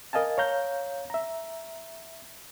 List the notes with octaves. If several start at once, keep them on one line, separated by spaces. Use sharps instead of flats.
A#4 D#5 F5 G#5 A5
C#5 F5 A#5 G6
E5 A#5